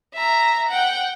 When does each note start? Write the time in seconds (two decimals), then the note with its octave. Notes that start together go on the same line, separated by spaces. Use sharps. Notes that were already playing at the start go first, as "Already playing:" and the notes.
0.14 E5 A#5
0.69 F#5 G5